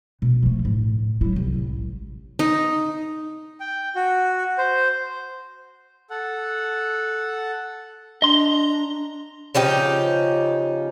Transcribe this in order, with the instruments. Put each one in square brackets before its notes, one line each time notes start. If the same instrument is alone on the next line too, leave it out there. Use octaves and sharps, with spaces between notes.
[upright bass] B2
F3 A3
A2
F#3 E4
C2
A1
[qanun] D#4
[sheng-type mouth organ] G5
F#4
C5
A4 F#5
[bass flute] D4 [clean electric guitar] D#5 C6 [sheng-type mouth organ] A#5
[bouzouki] C#3 F3 D#4 G4